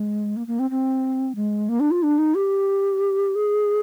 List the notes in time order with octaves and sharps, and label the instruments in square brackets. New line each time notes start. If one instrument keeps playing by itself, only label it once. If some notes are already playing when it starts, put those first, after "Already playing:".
Already playing: [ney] G#3
A#3
A#3
C4
C4
G#3
A#3
D4
F4
D4
D#4
G4
G#4